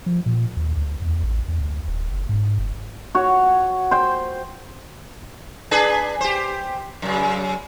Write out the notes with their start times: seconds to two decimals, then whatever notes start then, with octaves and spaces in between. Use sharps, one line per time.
0.06 F3
0.26 A#2
0.57 D#2
0.77 D2
1.02 E2
1.23 A1
1.48 E2
1.61 D2
1.88 D#1
2.11 F#1
2.29 G#2
2.59 F#1
3.15 F#4 C#5
3.91 C5 G5
5.71 D4 G#4 B4
6.21 G4 C5
7.02 F#2 C#3